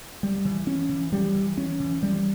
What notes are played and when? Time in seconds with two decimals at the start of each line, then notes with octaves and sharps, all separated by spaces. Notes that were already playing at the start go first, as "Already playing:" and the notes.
0.23 G3
0.45 E3
0.67 C#4
0.89 E3
1.13 G3
1.35 E3
1.57 C#4
1.80 E3
2.03 G3